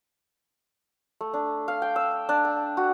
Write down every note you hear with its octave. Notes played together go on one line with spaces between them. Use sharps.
A3
D4
F5
G5
E6
D4
G5
F#4